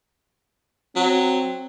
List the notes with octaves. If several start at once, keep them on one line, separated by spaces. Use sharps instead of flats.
F#3 C4